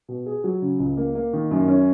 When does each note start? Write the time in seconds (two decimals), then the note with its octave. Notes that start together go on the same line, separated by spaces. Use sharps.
0.08 B2
0.26 G#4
0.44 F#3
0.62 C#3
0.80 C#2
0.97 A#3
1.15 A#3
1.33 D#3
1.51 F#2
1.68 C#4